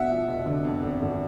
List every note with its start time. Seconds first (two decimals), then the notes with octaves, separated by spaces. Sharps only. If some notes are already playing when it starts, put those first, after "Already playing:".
Already playing: B2 E5 F#5
0.10 F3
0.27 F1
0.46 D3
0.64 F2
0.82 G#1
1.02 G#1